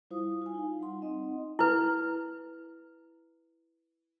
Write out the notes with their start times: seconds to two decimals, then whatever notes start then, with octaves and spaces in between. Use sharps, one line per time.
0.10 G3 E4 F4 C5 F5 D#6
0.42 F4 G#5
0.54 D#4 F5
0.79 G3 F#5 C6
1.02 C4 D#4 D#5 F#5
1.59 E4 B4